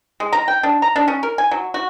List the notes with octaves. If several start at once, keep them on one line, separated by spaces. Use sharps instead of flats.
G#3
A#5
G5
D4
A#5
D4
C#4
A#4
G#5
F#3
F#4